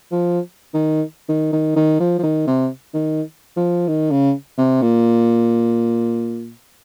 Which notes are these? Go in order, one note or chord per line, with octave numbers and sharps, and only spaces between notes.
F3
D#3
D#3
D#3
D#3
F3
F3
D#3
C3
D#3
F3
D#3
C#3
C3
A#2